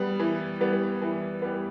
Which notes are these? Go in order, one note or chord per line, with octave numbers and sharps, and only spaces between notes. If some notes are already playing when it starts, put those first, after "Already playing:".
Already playing: G3 B3
E3
G3 B3
E3
G3 B3